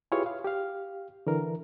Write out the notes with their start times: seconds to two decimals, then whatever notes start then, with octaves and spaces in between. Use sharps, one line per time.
0.12 E4 F4 G4 G#4 B4 C#5
0.26 F5
0.45 G4 F5
1.27 D3 E3 A#4